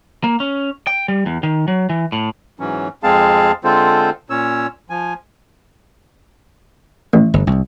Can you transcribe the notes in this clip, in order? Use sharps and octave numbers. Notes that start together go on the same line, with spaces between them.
A#3
C#4
G5
G3
E2
D#3
F#3
E3
A2
G#2 E3 F#3 C#4
F2 G#3 C4 G#4 F5 A5
D3 G#3 C4 F4 A4 C5
A#2 C#4 C#5 E6
F3 G#5
A1
G1
C2